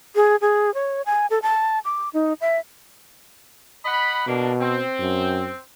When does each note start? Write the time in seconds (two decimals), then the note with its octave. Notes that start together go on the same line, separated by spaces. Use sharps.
0.15 G#4
0.41 G#4
0.74 C#5
1.06 G#5
1.30 A4
1.42 A5
1.85 D6
2.13 D#4
2.41 E5
3.85 D#5 F#5 B5
4.27 B2 A#3 D4
4.60 C4
4.99 F#2